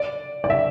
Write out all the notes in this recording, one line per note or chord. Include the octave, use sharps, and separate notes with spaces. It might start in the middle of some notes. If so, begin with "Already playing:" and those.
Already playing: D5
D5
E5